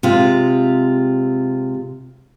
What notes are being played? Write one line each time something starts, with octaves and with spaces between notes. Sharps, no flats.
C3 G#3 F4